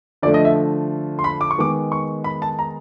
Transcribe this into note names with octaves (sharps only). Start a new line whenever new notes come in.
D3 F3 A3 D5
D#5
E5
C6
B5
D6
C#6
D#3 G#3 B3 D6
C#6
B5
A5
A#5